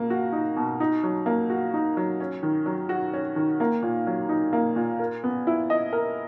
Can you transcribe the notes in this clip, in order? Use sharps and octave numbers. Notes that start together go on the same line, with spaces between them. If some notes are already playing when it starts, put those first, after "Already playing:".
Already playing: B2 A#3
F#4
D#4
B2
D#4
F#3
A#3
F#4
D#4
F#3
C#4
D#3
F#3
F#4
C#4
D#3
A#3
A#2
F#3
D#4
A#3
A#2
A#4
B3
E4
D#5
A#4